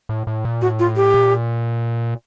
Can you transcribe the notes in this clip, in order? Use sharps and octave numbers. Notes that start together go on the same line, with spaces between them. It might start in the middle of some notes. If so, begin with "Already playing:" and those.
A2
A2
A#2
A2 F#4
F4
G4
A#2